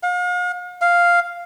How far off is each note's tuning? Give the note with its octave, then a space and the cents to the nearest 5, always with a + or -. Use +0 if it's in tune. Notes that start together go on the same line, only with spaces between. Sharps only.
F5 +45
F5 +0